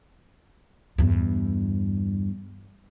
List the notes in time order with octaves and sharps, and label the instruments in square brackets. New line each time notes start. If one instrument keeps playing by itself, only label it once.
[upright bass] E2 G2